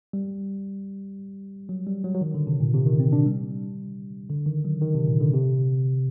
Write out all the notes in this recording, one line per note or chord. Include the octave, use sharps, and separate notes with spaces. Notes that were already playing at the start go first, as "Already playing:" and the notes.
G3
F#3
G3
F#3
F#3
D#3
D3
C3
A#2
C3
D#3
C4
D4
G3
D3
D#3
F#3
D#3
C3
A#2
D3
C3